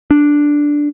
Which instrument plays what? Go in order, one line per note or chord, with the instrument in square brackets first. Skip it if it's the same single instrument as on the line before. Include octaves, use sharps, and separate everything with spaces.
[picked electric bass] D4